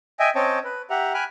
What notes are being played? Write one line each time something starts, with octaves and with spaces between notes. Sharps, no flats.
D#5 E5 G5 G#5
C4 C#4 C#5 D#5 G5 A5
B4
G4 E5 F#5 A#5
G5 G#5 B5 F6 F#6